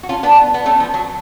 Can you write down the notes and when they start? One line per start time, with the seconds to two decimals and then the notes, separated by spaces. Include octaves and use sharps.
0.03 F#4
0.09 C#4 F4
0.23 B3 D4
0.54 B3
0.66 A3 C#4
0.80 F3
0.94 F#3